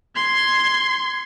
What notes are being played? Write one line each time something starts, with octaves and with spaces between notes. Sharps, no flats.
C6 G#6